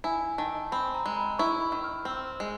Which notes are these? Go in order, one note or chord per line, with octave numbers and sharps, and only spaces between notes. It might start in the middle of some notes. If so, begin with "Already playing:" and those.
E4 G#5
D#3 A5
C4 B5
A#5
G#3
B5
E4 C#6
B5
D#3
F6
C4 E6
G#3